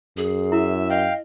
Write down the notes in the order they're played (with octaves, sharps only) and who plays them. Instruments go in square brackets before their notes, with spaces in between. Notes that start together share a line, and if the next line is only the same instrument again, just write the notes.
[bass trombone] F#2 [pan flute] G#4
[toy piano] E4 [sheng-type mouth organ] E5
[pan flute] D#5 [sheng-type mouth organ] F5 G5